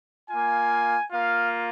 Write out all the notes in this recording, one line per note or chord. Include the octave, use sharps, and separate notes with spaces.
A#3 F4 G#5
A#3 F4 F5